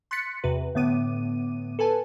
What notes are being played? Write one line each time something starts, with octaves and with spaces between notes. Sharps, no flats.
C6 F#6 A6 B6 C#7
E2 C3 F#4 B4
A2 D3 B3 D6 D#7
A4 B4 G#5 A5